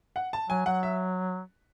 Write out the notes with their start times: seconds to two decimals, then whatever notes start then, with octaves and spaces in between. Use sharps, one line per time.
0.16 F#5
0.33 A5
0.49 F#3 G#5
0.66 F#3 F#5
0.83 E5